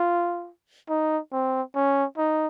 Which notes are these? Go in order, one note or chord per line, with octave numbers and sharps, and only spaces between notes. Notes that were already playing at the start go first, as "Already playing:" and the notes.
Already playing: F4
D#4
C4
C#4
D#4